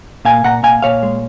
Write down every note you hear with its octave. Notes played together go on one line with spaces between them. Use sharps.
A#2 F5 G#5
A#2 F#5 A#5
A#2 F5 G#5
A#2 C#5 F5
G#3